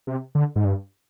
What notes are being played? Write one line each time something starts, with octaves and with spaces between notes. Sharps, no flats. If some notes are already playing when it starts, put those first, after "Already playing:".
C3
D3
G#2
G2